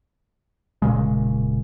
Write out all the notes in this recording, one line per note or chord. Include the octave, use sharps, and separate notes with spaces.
E1 A#2 C#3 G#3